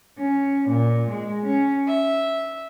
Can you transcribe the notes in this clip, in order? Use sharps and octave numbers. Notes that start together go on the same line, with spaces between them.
C#4
A#2
G#3
C#4
E5